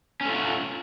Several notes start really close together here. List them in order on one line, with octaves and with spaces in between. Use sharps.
C#4 A3 F4 F#4